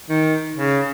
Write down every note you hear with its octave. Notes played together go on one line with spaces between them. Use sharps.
D#3
C#3